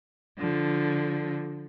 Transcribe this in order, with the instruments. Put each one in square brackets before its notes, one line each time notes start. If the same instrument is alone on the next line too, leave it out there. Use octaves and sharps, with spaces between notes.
[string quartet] D3 F3